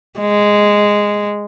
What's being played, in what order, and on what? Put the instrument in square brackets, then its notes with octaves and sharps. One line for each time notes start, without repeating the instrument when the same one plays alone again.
[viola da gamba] G#3